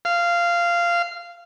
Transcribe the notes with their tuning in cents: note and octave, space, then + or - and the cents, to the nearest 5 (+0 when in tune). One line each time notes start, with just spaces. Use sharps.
F5 -15